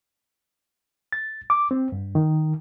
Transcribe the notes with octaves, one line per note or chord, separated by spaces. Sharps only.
A6
D6
C4
G2
D#3